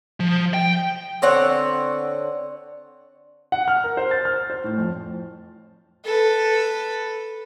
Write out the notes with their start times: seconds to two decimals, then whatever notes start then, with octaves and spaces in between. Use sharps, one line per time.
0.20 F3
0.54 G5
1.22 D3 C4 C#5 F#5
3.52 F#5
3.68 F6
3.84 A#4
3.97 C5
4.11 A6
4.25 F6
4.50 C5
4.64 A2
4.78 F2
6.05 A4 B4